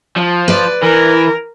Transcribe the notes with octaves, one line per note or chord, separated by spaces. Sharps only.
F3
B4 D5
E3 A#4